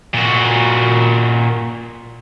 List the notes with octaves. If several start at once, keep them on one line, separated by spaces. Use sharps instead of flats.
A#2 F#4